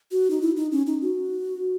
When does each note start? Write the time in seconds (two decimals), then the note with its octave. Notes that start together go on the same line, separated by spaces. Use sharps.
0.11 F#4
0.30 D#4
0.41 E4
0.57 D#4
0.72 C#4
0.87 D#4
1.02 F#4